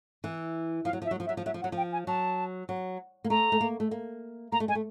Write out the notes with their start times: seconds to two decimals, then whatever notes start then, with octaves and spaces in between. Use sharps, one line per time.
0.24 E3
0.85 F3 F5
0.93 F#3
1.02 F3 E5
1.11 F#3
1.20 F3
1.26 E5
1.29 F#3
1.37 F3
1.46 F#3 E5
1.54 F3
1.62 F#3 F#5
1.72 F3
1.77 G5
1.92 G#5
2.07 F#3 A5
2.69 F#3
3.24 A#3
3.30 A3 A#5
3.52 A3
3.61 A#3
3.80 A3
3.91 A#3
4.52 A#3 A#5
4.60 A3
4.68 G#3 G#5
4.75 A3